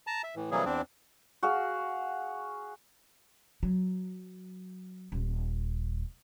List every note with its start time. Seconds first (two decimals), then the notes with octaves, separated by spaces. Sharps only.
0.07 A5 A#5
0.24 E5
0.36 A2 E3
0.51 C3 E3 F#3 G3 A#3 G#4
0.65 E2 C4 D4
1.43 F#4 G#4 F5
3.63 F#3
5.12 D#1